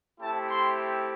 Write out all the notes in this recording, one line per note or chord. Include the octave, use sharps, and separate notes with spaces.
A3 C4 E4 G4 A5
C6